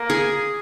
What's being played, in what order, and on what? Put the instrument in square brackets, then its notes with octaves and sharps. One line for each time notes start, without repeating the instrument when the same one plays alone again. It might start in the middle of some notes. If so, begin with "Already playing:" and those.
Already playing: [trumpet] A#3
[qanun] G#4